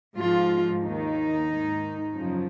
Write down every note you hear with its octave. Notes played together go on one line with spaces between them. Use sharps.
G#2 F3 F4
D#2 D#3 D#4
G#2 D#3
F#2 C#3 F3